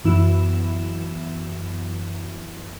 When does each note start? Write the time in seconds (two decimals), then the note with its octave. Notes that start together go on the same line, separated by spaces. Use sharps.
0.04 F#2 E3 B3 E4 E7